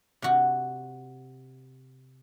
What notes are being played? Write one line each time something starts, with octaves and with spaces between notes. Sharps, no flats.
C3 F#4